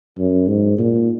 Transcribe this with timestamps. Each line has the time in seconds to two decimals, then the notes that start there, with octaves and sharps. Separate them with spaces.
0.18 F#2
0.48 G#2
0.79 A#2